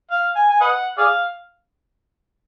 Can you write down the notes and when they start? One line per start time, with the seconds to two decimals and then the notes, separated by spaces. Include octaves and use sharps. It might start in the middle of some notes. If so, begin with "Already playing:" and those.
0.11 F5
0.36 G#5
0.50 G#5
0.61 B4 D#5 F#5
0.98 G#4 D5 F5